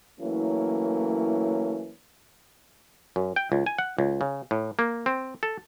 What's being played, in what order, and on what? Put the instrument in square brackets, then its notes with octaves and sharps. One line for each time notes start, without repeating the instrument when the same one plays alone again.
[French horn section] E3 F#3 A3 A#3 C#4 E4
[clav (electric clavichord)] F#2
G5
C#2
G#5
F#5
C#2
C#3
A2
A#3
C4
A4